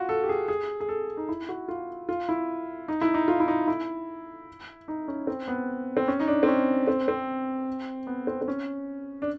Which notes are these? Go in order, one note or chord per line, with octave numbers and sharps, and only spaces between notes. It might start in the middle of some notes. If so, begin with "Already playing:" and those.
Already playing: F4 F#4
A4
G4
G#4
G#4
G#4
A4
D#4
E4
F#4
F4
F4
E4
D#4
E4
D#4
F4
E4
D#4
E4
D#4
C#4
C4
B3
C4
C#4
D#4
D4
C4
C#4
C4
C4
B3
C4
C4
C#4
D4